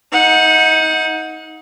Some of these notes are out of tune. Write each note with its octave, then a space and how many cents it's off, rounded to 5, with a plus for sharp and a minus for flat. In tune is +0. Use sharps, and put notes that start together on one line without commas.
D#4 +25 F#5 -25